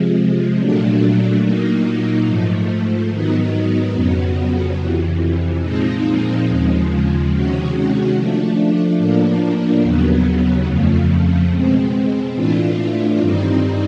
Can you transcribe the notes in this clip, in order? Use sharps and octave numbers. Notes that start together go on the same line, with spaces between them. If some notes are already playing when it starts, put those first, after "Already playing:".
Already playing: C3 F3 G#3
A#2 F#3 A3 D4
A#2 F#3 A#3 D#4
G#2 F3 A3
G#2 D#3 F#3 B3 D#4
F2 C#3 F#3 B3
F2 C3 E3
A#2 F3 G#3 C4 D#4
D#2 C#3 F3 G#3
C3 D#3 G#3 C#4 F#4
F3 A3 D4
A2 F3 A#3 D4
D#2 C#3 F#3 B3
F2 C#3 F3 A3
B2 G#3 C4
A2 E3 A3 D4 F4
G2 D#3 G3 C4 D#4